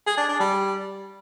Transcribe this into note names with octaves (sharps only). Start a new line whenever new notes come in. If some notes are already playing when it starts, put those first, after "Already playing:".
G#4
D4
D4
G3